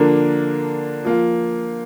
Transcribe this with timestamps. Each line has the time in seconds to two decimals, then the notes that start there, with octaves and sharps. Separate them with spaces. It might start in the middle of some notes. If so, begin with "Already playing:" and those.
Already playing: D3 F3 A#3 D4 A#4
1.04 F3 A#3 F4